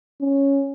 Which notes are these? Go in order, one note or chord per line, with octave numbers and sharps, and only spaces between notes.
C#4